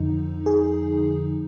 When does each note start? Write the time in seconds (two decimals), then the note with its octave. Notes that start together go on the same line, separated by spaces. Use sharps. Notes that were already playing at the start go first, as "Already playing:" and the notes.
Already playing: F2 D3 F3 D#4
0.46 G#4